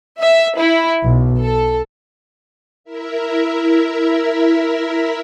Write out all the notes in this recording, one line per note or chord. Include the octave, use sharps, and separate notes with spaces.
E5
E4
B1
A4
E4 A#4 E5